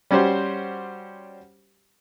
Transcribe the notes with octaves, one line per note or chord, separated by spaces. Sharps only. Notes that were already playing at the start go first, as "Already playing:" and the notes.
G3 C#4 F#4 G4 C5